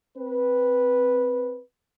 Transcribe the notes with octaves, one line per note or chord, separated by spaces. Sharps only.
C4 B4